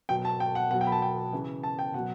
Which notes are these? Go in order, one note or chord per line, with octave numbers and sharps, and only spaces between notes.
B2 F#3 G5
A5
G5
F#5
B2 F#3 F#5
G5
B5
A5
G5
C#3 E3
A5
G5
B2 F#3 F#5